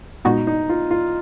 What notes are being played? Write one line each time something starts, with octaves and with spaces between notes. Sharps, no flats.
A#2 G#3 B3 D#4 F#4
D#4
F4
F4